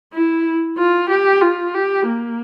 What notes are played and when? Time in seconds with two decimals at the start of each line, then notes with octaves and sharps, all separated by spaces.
0.13 E4
0.78 F4
1.10 G4
1.42 F4
1.74 G4
2.06 A#3